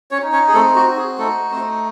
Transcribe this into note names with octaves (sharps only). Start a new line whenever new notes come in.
C#4 C#5
D#4
C#4 C#5
G#4
A3 C4 A4
F#4
F#4
G#4
A3 D#4 A4
A3 C4 C5